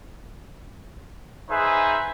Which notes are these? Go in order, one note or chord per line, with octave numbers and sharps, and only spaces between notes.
D#4 G#4 B4 C5 E5